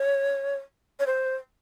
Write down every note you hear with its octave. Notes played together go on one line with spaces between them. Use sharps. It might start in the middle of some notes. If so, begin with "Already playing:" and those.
Already playing: C#5
C#5
C5